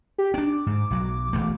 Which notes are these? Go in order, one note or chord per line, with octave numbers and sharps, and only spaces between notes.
G4
C#4 D4 D6
G#2
B1 F#3
E1 A3